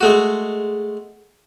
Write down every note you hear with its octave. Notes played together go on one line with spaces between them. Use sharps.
G#3 A3 F#4